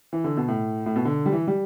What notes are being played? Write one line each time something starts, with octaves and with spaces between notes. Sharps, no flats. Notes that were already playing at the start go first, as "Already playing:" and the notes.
E3
D3
B2
A2
A2
B2
D3
G3
E3
G3